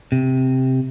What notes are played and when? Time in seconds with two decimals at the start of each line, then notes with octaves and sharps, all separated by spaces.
0.12 C3